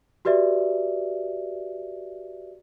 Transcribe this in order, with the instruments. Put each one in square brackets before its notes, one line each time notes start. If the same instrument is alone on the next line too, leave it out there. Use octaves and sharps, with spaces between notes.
[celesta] F#4 G4 B4 D5 E5